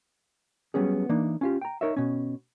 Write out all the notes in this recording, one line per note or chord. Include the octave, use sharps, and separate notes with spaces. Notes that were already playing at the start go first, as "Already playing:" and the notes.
F#3 G3 B3 C#4 G#4
E3 A#3 D4 D#4
C#4 F4 G4
G5 A#5
D#4 A#4 C#5 D#5 E5
B2 C#4